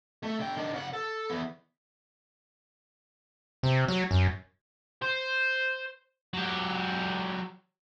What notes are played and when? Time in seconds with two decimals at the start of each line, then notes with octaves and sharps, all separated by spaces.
0.23 A3
0.39 D3 G5
0.57 D#3 D4
0.73 C#3 F#5
0.93 A4
1.30 E3 B3
3.63 C3
3.88 F#3
4.11 F#2
5.02 C5
6.34 F#3 G4